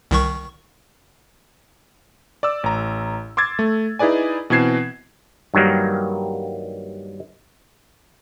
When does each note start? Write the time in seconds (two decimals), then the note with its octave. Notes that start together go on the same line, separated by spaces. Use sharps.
0.11 C2 D#3 C#6
2.43 D5 D6 E6
2.64 A1 A#5
3.37 C6 D6 E6 G#6 A6
3.59 A3
3.99 D#4 E4 G#4 B4 D5 G#5
4.50 B2 E3 C4 G#6 C7 E7
5.54 G2 D#3 F#3 G3 A#3